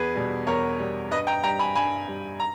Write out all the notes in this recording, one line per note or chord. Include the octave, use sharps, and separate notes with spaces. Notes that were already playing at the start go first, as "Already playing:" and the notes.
Already playing: E2 G#4 B4
B2 G3
E2 A#4 C#5
B2 G3
G2 B4 D#5
G5 A#5
G3 G5 A#5
G#5 B5
G2 G#5 B5
G3
A#5